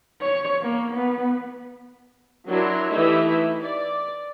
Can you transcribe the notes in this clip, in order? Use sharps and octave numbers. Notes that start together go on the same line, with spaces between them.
C#5
A#3
B3
F#3 D4 E4 A#4 C6
E3 A3 D#4 E4 G4 E5
D5